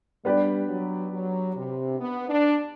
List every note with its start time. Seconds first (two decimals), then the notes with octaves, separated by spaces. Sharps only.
0.25 G3 B3 D4 G4 B4 D5
0.68 F#3
1.13 F#3
1.56 C3
2.00 B3
2.29 D4